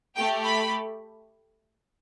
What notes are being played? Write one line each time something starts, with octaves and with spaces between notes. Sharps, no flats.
A3 G4 G5
B5